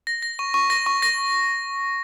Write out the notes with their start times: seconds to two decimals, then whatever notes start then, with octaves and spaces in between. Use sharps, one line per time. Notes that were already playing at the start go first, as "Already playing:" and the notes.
0.07 A#6
0.22 A#6
0.39 C#6
0.54 C#6
0.70 A#6
0.86 C#6
1.02 A#6